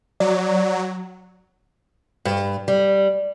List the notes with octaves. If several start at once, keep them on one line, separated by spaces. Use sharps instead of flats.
F#3 D5
G2
G3